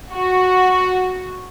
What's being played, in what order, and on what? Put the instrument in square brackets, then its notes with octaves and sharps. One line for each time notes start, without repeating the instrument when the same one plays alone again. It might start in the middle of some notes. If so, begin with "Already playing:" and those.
[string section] F#4